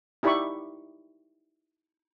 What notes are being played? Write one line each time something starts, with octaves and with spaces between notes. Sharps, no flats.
D#4 E4 G4 D5 B5 C#6